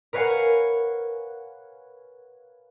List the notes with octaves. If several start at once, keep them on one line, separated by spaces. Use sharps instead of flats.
A#4 B4 C#5 F5 F#5 G#5